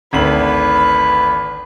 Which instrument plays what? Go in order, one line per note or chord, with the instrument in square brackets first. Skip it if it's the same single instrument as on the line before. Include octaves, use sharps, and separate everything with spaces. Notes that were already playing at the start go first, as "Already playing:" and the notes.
[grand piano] G#1 D2 F#7 [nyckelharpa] B4 B5